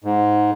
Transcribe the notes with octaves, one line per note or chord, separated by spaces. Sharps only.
G#2